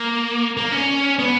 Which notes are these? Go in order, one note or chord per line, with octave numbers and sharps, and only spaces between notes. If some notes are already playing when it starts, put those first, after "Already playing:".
Already playing: A#3
A#3
C#4
B3